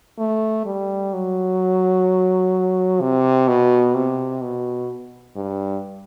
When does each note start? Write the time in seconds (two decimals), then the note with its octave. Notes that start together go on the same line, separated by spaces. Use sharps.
0.18 A3
0.65 G3
1.13 F#3
3.01 C3
3.48 B2
3.94 C3
4.41 B2
5.36 G2